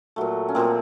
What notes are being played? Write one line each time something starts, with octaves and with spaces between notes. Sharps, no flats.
A#2 F#3 A3
C#4
A#2 F3 A3 A#3 C4